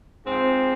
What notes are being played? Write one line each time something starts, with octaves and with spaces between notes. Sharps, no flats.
G#2 F3 C4